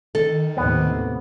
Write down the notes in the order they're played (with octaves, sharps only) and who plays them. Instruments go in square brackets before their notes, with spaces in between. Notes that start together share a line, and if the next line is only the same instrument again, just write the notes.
[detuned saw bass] D#3 [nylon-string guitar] A4
[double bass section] D#2 A2 C3 [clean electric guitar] B3